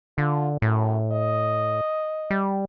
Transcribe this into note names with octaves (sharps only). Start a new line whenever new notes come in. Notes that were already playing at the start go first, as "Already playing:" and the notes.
D3 F4
F#2 A2
D#5
G3